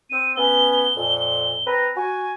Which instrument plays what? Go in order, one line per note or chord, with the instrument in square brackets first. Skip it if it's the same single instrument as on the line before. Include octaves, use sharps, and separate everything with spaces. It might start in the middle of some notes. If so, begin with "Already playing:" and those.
[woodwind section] C4 [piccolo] D#7
[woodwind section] B3 C#4 [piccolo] G7
[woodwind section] F2 A#2
C4 B4 A#5
[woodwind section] F#4 [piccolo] G#5